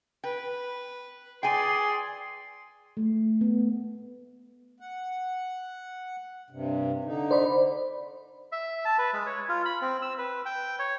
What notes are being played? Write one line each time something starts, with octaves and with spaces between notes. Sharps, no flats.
B4 G5
G#4 D5 G5 G#5 C6
A3
B3
F#5
G2 C3
D3 D#4
C5 D5 B5
E5
A5
B4
G#3
C#5
F4
B5
C4
E6
B4
G5
C#5